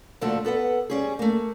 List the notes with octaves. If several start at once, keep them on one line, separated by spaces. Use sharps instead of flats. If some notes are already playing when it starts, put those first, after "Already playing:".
A#2 D3 F3 A3 F#4 A4
B3 A4 B4 F#5
G3 C#4 G#4
A3 A#3